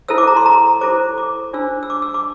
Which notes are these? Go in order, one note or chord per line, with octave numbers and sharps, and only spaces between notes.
E4 A4 C5 E6
D6
A#5
C6
A#5
E4 A4 C5 D6
D6
D4 F4 C5 E6
E6
D6
E6
D6